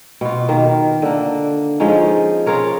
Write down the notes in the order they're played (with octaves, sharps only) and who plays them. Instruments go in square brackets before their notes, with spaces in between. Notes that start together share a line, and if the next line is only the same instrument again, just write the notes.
[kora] B2 F4
D#3 A#3
D3 A#3
F3 G#3 C#4 D#4
F4 G#4 A#4 C#5